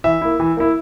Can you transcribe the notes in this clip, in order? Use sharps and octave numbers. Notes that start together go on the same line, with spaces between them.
E3 E5
A#3 E4
E3
A#3 E4